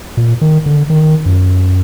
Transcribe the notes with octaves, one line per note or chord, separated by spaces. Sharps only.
A#2
D#3
D3
D#3
F#2